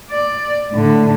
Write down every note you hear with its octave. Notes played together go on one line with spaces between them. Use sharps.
D5
A2 D3